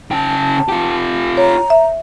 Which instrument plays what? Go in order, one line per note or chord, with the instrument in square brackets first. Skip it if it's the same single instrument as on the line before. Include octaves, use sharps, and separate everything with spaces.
[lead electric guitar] C#3 G5 [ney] A5
[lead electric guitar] F4 G4
[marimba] C#5 [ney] A#5
[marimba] E5